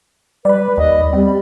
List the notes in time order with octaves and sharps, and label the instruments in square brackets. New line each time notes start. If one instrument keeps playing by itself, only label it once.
[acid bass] G3 [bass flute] B4 [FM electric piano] D5 B5
[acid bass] D#2 [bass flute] D#5
[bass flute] G3 [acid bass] C4